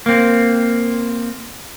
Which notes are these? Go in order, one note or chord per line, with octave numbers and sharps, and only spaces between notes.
A#3 C4